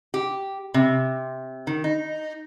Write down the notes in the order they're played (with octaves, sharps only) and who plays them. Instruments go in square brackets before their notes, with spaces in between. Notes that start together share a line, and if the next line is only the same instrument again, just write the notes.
[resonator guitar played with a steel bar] G4
C3
D#3
D#4